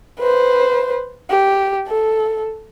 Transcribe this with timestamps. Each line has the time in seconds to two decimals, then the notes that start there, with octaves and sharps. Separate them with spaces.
0.20 B4 C5
1.30 G4
1.88 A4